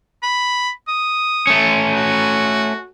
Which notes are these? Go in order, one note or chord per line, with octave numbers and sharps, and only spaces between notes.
B5
D#6
A3 C#4
F#4